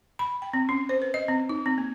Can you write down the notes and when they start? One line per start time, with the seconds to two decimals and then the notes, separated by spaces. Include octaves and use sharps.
0.19 B5
0.42 G5
0.54 C4
0.69 C#4
0.89 C5
1.02 B4
1.14 D#5
1.28 C4
1.49 D#4
1.66 C4
1.78 A#3